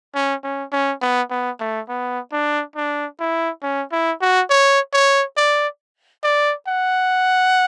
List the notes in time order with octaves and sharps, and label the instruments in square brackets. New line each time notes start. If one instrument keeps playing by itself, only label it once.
[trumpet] C#4
C#4
C#4
B3
B3
A3
B3
D4
D4
E4
C#4
E4
F#4
C#5
C#5
D5
D5
F#5